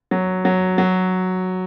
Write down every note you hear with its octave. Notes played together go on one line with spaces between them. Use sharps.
F#3
F#3
F#3